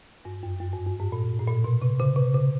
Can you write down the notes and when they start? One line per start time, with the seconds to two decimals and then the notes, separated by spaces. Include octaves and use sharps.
0.25 G2
0.43 F#2
0.60 F#2
0.73 G2
0.86 G2
1.00 G#2
1.12 A#2
1.39 A2
1.47 A#2
1.64 B2
1.82 C3
2.00 C#3
2.16 C3
2.34 C#3